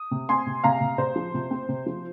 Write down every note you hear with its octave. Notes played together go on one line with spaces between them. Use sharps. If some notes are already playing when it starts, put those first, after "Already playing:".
Already playing: D#6
C3
C4 G#5 C6
C3
C3 F5 A#5
C3
C3 C5
F3
C3
C4
C3
F3